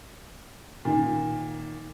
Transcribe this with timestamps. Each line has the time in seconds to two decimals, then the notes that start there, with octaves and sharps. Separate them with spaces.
0.85 A#2 D#3